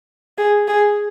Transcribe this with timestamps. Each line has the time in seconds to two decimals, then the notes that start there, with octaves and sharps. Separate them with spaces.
0.38 G#4
0.68 G#4